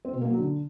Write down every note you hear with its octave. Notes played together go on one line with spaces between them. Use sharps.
C4
B2
A#3
F#3
D3